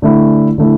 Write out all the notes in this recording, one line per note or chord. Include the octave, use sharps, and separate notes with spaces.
D3 A3 E4
D3 A3 E4